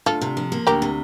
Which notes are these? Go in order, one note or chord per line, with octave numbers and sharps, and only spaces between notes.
D2 F4 A4
C3
F3
A#3
D2 G4 A#4
C3